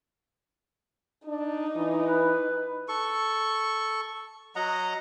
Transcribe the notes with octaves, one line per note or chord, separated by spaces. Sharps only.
D4 D#4
E3
B4
A4 C#6
F#3 D#5 F#5 A#5